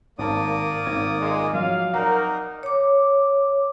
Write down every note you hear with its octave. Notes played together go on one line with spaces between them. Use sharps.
G#1 A#3 D5 A5 D#6
G#1 G#6
A#2 G#3
F3 F#3 F5
A#3 C4 D#4 A#4 D5 F#5
C#5 D6